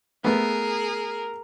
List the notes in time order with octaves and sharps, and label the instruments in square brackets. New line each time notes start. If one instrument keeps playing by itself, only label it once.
[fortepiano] A3 B3 [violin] G#4 [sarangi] A#4